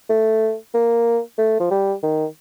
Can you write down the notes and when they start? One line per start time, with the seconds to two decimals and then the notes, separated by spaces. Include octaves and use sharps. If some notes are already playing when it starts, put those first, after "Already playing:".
0.09 A3
0.74 A#3
1.38 A3
1.60 F3
1.71 G3
2.03 D#3